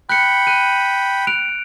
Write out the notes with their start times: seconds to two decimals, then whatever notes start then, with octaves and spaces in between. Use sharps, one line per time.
0.09 G5 B5 F#6 C#7
0.47 F#6 D#7
1.27 F#6 D7 F7